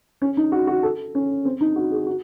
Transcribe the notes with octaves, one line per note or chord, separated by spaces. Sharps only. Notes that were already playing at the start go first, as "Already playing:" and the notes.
C#4
D#4
F#4
F#4
A4
C#4
C4
D#4
F#4
G#4
F#4